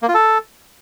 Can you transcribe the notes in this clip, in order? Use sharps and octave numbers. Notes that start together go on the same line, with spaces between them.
A#3
F4
A4